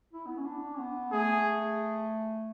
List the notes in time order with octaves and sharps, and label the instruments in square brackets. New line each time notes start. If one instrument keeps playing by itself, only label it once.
[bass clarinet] E4
B3
C#4
D4
C#4
B3
[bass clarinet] A3 [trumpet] G#4